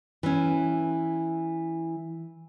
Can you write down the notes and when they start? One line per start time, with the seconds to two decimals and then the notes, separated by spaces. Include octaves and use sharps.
0.23 E3 C#4